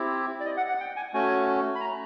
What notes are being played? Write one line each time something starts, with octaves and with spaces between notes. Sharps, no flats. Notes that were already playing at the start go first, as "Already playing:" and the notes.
Already playing: C4 E4 G4
D5
D#5
F#5
F#5
G5
G#5
A3 C#4 F#4 G#5
B5
A#5